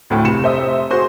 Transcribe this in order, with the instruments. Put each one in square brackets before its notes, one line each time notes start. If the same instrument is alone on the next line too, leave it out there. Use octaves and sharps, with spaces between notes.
[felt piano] D2 A2 G5
F1 C#7 E7
[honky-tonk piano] C5 E5 D#6
[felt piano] F#4 G#4 [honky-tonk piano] C5 C6